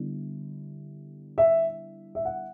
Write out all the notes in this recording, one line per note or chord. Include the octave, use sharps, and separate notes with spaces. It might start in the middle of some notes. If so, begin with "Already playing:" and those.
Already playing: D3 G3 B3 E4
E5
E5
F#5